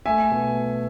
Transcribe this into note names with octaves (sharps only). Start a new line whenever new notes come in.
A3 E5 G#5
B2